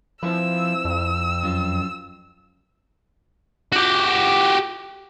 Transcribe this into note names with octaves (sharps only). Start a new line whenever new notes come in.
F3 C4 E4 B4 E6
F2
F#2 F4
F#4 G4